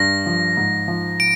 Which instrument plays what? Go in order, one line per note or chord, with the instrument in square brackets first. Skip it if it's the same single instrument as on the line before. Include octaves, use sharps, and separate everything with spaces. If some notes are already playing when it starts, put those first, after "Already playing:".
Already playing: [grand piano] G2 [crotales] A#6
[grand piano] F3
G#2
F3
[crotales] D7